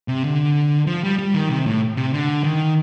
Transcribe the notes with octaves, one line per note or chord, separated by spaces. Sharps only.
C3
D3
F3
G3
G3
D#3
C3
A2
C3
D3
D#3